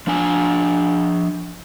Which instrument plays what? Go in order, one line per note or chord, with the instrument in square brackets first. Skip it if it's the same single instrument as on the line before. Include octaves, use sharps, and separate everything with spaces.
[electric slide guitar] F3 D4 G#5